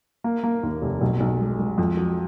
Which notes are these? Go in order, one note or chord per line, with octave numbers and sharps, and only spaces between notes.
A#3
A#3
D#2
F1
B1
B1
G#3
G#3
F2
F#3